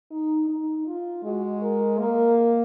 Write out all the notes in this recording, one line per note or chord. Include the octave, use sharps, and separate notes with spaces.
D#4
D#4
F4
G#3 F#4
A#4
A#3 A#4